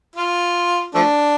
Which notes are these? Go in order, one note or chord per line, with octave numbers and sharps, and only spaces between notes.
F4
F3 A3 D4